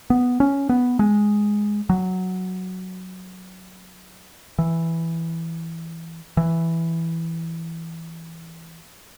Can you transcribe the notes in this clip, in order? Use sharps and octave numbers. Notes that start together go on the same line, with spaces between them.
B3
C#4
B3
G#3
F#3
E3
E3